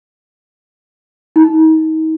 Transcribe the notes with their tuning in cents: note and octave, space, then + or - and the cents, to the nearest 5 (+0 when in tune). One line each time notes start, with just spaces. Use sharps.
D#4 +35